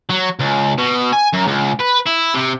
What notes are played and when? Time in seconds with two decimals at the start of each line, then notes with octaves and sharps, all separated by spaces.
0.10 F#3
0.39 C#2
0.78 B2
1.13 G#5
1.33 F#2
1.47 C#2
1.79 B4
2.06 E4
2.34 C3